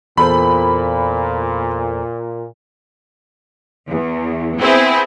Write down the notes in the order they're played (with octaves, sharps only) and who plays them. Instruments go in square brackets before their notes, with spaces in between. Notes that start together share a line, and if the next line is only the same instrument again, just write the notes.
[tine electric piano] E2 A4 C5 [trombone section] A#2 [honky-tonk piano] B5
[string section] E2
B3 C4 E4 G#4